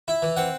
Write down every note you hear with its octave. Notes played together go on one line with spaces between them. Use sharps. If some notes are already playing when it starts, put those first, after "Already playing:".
E4
E3
C4 F#5